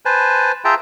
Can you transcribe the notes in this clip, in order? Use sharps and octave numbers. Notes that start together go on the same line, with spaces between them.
B4 C5 G#5 A5
F4 G#4 E5 G5 A5 A#5